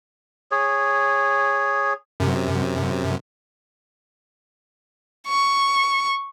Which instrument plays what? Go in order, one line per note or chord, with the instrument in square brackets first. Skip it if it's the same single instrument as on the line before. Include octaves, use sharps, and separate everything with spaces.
[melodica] G#4 C#5
[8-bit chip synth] F#2 C3
[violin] C#6